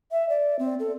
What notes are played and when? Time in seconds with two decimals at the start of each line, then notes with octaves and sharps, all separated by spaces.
0.12 E5
0.29 D5
0.59 C4
0.80 A4